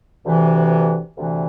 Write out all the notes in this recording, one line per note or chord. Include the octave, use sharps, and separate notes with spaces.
D2 C3 E3
D2 C3 E3